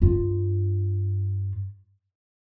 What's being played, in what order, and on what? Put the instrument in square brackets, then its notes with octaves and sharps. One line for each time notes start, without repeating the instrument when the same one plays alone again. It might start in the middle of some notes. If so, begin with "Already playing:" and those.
[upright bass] G2 F4